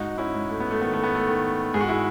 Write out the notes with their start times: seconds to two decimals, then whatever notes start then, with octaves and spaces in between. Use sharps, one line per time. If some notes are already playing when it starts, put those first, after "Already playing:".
Already playing: G#2 D#4 F#4
0.18 C#4 E4
0.34 G#2
0.49 A3
0.60 B3
0.71 A3
0.80 D#3 B3
0.93 A3
1.03 B3
1.15 A3
1.28 D#3
1.74 G#2 G#4
1.81 F#4
1.88 E4 G#4